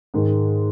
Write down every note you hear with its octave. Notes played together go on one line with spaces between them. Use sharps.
G#2 D#3 G#3